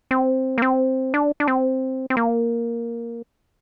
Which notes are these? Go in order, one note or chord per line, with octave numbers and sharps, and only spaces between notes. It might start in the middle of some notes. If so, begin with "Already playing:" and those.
C4
A#3
C4
D4
D4
C4
C4
A#3